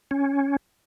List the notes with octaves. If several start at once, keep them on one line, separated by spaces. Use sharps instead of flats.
C#4